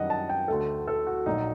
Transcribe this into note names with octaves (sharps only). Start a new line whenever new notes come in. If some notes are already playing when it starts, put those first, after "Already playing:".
Already playing: F#2 D#3 G3 D#5 F#5
A5
G5
D2 D3 A3 A4
A4
F#4
A#1 A#2 F#3 D#4